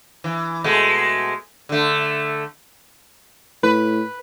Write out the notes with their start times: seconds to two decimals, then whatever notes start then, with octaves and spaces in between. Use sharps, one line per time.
0.24 E3
0.64 B2 G#3 A3
1.69 D3 A3
3.63 A2 B4